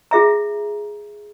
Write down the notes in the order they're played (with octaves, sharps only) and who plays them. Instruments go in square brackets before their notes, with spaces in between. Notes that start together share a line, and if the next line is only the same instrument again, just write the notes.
[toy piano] F4 G#4 E5 A#5